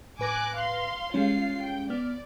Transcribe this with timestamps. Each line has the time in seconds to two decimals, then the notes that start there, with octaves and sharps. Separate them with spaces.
0.19 A2 B4 G#5 D6 F#6 A#6
0.55 F5 C6
1.14 G3 G#3 C#4 F4 F5 C7
1.61 G5
1.90 B3 D5 F6